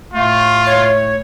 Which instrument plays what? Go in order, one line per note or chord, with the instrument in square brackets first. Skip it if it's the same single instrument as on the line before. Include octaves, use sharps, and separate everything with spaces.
[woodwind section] A2 A3 [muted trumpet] F4
[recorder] C#5